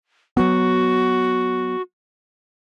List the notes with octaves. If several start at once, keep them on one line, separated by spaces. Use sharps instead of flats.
F#3 B3 F#4